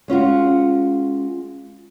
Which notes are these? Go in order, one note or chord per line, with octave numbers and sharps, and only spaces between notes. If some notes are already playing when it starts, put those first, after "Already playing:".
G#3 C#4 F4 F#4